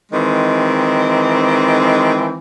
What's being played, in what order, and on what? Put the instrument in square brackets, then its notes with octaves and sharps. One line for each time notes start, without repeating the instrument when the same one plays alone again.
[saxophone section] D#3 E3 G#3 C4